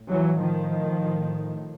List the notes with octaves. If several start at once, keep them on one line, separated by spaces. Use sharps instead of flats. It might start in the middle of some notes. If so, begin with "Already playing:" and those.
Already playing: A2
E3 F#3
D#3 F3